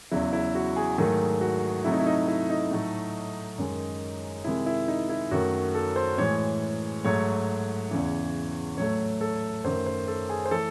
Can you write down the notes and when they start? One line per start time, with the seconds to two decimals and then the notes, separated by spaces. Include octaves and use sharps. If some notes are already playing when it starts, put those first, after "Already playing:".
0.11 E2 C#3 F#3 E4
0.33 E4
0.55 F#4
0.76 G#4
0.98 G#2 D#3 F#3 A3 G#4
1.41 F#4
1.84 C3 F#3 A3 E4
1.92 D#4
1.99 E4
2.06 D#4
2.28 E4
2.50 D#4
2.71 A2 F#3 A3
3.58 F#2 D#3 G#3
4.44 C3 D#3 G#3 E4
4.66 E4
4.88 D#4
5.09 E4
5.31 F#2 D#3 A3 F#4
5.75 A4
5.96 C5
6.18 A2 E3 G#3 C#5
7.05 G#2 F#3 A3 C#5
7.91 E2 C#3 E3
8.78 A2 F#3 A3 C#5
9.21 A4
9.64 F#2 D#3 A3 C5
9.86 C5
10.08 A4
10.29 G#4
10.45 C5
10.51 E3 A3 A4